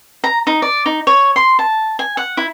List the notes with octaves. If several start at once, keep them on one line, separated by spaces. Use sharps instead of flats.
A#5
D#4
D5
D#4
C#5
C6
A5
G#5
F#5
E4